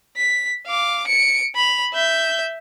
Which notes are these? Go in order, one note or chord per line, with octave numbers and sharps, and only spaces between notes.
B6
F5 D6
C#7 D7
B5 F7
E5 G6